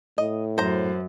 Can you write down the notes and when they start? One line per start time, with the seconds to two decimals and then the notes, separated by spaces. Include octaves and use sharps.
0.18 A2 D#5
0.58 F#2 C5 A#5